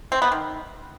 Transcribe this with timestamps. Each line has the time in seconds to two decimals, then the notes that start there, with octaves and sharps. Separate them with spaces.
0.12 C4
0.22 B3
0.32 D#3